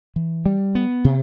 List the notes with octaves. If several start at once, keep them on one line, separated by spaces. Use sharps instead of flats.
E3
G3
B3
C3